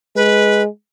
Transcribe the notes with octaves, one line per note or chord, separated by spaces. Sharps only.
G#3 B4